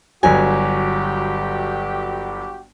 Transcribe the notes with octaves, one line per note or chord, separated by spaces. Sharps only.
G1 F#3 F#4 G4 G#5